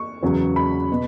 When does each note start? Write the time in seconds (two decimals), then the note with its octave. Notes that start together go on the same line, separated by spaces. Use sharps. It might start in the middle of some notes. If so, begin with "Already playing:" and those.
Already playing: C#6
0.23 E2 C#3 F#3
0.56 B5
0.92 B2